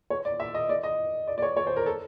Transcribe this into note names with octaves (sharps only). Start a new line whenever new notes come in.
C#5
D5
E5
D#5
D5
D#5
D5
D5
C#5
C#5
C5
A#4
A4